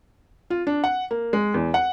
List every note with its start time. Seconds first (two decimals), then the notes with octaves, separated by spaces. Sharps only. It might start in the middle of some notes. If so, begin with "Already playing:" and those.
0.50 F4
0.67 D4
0.84 F#5
1.11 A#3
1.33 G#3
1.54 E2
1.74 F#5